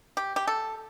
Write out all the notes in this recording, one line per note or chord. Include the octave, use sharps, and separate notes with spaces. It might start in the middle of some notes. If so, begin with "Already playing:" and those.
G4
G4
A4